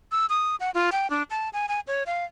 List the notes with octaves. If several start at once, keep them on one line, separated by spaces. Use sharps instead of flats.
E6
D#6
F#5
F4
G5
D4
A5
G#5
G#5
C#5
F5